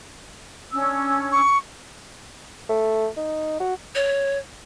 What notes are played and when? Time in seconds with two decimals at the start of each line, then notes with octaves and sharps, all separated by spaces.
0.72 C#4 D4 E6
1.32 C#6
2.69 A3
3.17 D#4
3.60 F#4
3.95 C#5